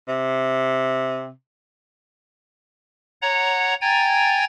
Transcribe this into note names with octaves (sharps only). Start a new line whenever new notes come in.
C3
C#5 F#5 A#5
G5 G#5 A#5 G#6 A6